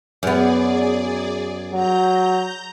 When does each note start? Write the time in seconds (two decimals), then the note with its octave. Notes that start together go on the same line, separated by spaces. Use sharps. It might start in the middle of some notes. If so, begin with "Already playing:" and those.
0.23 F#2 B3 G#4 D5
1.73 F#3 A#5 G6